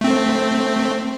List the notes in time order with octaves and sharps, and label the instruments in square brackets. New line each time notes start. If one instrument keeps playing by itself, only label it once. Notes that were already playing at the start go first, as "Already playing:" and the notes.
[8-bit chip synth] A3 C4